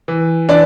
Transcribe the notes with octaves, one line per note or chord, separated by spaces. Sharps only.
E3
E3 D4 D5